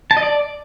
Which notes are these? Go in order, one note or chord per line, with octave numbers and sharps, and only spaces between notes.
A5
D#5
D5